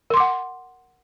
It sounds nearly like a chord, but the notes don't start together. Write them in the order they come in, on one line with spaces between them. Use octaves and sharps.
A#4 C6 D6 F#5